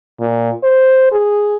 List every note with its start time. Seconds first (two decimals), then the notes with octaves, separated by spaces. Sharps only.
0.20 A#2
0.63 C5
1.12 G#4